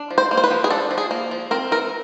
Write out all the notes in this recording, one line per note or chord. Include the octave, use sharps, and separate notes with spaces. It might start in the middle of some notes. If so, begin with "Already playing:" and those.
Already playing: D4
F3
C5
A#3
C5
B4
F3
G#4
D4 A4
F3
G#4
A#3
F3
C4 A#4
E3 A#4